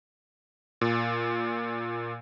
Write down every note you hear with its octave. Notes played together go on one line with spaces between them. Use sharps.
A#2